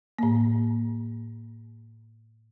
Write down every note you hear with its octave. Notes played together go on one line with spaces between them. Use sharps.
A2 A#3